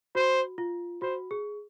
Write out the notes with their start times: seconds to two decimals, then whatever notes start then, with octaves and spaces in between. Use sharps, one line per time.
0.15 F#4 C5
0.58 F4
1.02 F#4 C5
1.31 G#4